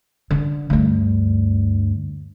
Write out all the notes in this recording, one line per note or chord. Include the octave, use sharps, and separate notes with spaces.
D3
D2 G2